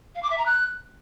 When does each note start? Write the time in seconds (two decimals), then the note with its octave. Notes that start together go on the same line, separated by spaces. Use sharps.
0.15 F5
0.23 D6
0.30 E5
0.38 A#5
0.46 F#6